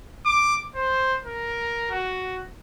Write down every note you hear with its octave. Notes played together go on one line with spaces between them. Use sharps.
D6
C5
A#4
F#4